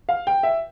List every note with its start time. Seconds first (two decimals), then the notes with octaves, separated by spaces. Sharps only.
0.09 F5
0.27 G5
0.43 E5